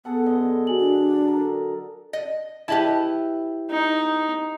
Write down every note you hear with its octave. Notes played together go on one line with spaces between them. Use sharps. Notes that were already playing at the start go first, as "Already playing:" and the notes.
B3 G#4 A4 F#5
F#2 D3 D#5
F#4 G#5 F#7
D4
A4 A#4
D#5
E4 G4 B4 D#5 A5
D#4